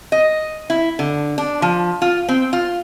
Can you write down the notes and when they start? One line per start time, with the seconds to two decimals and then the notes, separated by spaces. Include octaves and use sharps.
0.12 D#5
0.70 E4
0.99 D3
1.38 D4
1.62 F3
2.02 F4
2.29 C4
2.53 F4